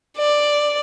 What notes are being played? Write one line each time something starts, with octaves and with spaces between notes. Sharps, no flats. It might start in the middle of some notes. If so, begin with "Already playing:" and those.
D5